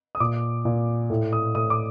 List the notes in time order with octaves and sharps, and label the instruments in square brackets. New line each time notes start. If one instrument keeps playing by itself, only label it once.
[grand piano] D#6
A#2 D6
A#2
A2
D#6
A2 D#6
D6